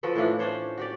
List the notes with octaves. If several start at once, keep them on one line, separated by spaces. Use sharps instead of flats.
F3 F#4 A4 B4
A2 E3 F3 D4
C#4 D4 C5 C#5
F#4 G4 D5